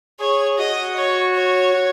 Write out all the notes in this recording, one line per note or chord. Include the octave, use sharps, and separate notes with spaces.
G#4 C#5
F#4 D#5
C#5
C#5
F#4